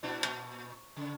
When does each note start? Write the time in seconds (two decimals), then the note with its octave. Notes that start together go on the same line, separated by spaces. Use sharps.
0.03 A#2 D4 E4
0.24 A#2
0.96 C#3